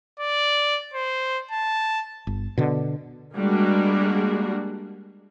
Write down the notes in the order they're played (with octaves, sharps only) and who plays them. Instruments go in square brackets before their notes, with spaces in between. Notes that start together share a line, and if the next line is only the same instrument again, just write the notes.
[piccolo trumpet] D5
C5
A5
[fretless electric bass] G1
B2 D3
[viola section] G3 G#3 A#3 D4 F#4